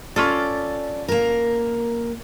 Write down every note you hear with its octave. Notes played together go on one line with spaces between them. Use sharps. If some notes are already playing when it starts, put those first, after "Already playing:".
C#4 F4 A4 D5
A#3 A#4